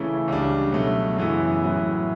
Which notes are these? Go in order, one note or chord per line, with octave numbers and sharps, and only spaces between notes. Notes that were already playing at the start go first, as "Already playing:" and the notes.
Already playing: C#3 E3 A3 C#4 E4
C#2 C#3 G3 D4
B2 F#3 A3
F#2 C#3 E3 B3 E4
A2 F#3 B3 E4